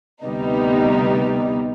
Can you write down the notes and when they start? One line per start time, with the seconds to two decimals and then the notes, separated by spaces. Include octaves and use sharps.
0.24 D2 C3 G3 B3 D#4